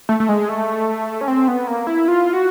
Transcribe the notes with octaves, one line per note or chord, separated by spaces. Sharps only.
A3
A3
G#3
A3
C#4
C4
B3
A#3
E4
F4
F#4